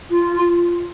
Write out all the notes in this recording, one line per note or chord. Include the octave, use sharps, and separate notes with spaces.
F4